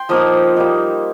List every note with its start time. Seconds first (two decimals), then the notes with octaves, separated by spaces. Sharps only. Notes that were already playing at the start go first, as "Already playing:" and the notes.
Already playing: G5 C6
0.09 F3 A#3 D#4 D#6
0.56 G3 A#3 D#4